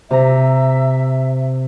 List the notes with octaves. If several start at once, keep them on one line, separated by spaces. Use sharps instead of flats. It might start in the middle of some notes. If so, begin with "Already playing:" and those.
C3 E5 A#5